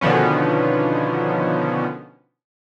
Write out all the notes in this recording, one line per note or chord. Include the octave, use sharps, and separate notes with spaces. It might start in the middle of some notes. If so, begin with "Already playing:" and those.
B2 D3 D#3 F3 B3 C#4